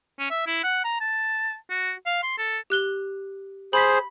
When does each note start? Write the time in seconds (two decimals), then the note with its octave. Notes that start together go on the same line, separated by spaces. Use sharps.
0.19 C#4
0.30 E5
0.47 E4
0.64 F#5
0.84 A#5
1.01 A5
1.70 F#4
2.06 F5
2.23 C6
2.38 A4
2.70 G4 F#6 G7
3.73 G#4 C5 B5 B6